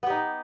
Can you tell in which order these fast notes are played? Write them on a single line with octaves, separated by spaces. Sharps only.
B3 G4 D#4